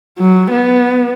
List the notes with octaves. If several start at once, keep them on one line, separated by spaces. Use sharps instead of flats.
F#3
B3